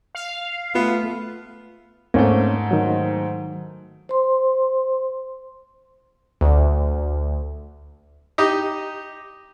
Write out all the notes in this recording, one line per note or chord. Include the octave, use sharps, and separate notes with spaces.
F5
A3 B3 F4
G#2 A3 A#3 C4 C#4
D#3 F#3
C5 C6
D2
D#4 G4 D#5